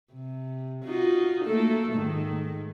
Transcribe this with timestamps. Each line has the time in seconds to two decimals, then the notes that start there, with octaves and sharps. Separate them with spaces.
0.13 C3
0.85 D#4 F4 F#4
1.44 A3 A#3 A4
1.94 G#2 D#3